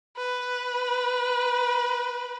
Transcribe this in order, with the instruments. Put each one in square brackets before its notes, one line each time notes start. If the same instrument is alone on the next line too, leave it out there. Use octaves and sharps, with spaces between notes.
[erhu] B4